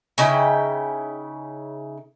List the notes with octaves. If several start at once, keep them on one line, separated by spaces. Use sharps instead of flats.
C#3 D#4 E4 G5